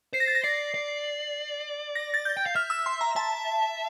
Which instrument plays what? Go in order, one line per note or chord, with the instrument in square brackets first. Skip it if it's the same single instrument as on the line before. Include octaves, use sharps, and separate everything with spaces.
[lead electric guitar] C5 [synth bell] C7
[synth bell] A#6
A6
A#6
[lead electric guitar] D5 [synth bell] C7
[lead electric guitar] D5
[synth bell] A#6
A6
G6
[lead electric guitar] G5
F5
[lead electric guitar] E5 [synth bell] F6
[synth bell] E6
C6
A#5
[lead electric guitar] E5 [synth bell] A5